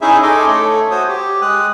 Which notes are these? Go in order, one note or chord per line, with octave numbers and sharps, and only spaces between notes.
C#4 D#4 E4 G#4 E5
D#4 A4 D#5 G#5 C6 D6
A3 A4 C#5
F#4 C5 C#5 D#6
G4
G#3 D#6 F#6